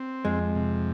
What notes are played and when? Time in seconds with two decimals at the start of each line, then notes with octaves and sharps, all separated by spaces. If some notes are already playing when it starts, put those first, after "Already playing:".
Already playing: C4
0.25 F2 G#3
0.55 C3